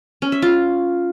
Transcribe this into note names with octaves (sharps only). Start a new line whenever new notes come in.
C#4
E5
F4